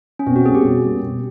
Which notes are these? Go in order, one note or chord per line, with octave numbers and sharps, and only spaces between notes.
C#4
B2 C4
F#4
G3 A#3 C#4 G#4
G4
B2
G3 A#3 C#4
B2